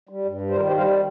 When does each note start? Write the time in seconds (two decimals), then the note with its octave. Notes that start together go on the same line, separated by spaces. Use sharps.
0.09 G3
0.25 G2
0.41 G3
0.50 C5
0.56 D#3 F4 A#4
0.67 G4 C5
0.72 G3
0.77 C5 F5